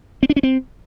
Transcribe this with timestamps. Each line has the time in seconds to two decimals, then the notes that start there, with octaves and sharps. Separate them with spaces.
0.23 C4
0.30 D4
0.36 C#4
0.43 C4